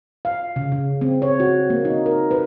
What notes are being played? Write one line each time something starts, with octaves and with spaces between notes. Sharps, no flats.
F5
C#3
C#3
C4
C#5
F#4
A#3
D#4
A#4
B4